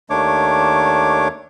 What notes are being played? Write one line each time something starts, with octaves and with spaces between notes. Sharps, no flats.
D#2 D#3 A3 D4 C#5 D6